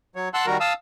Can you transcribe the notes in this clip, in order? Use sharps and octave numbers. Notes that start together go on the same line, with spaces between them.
F#3 C#5
F#5 A5 C6 E6 F#6
D#3 G3 F#4 A#4
F5 A5 D#6 E6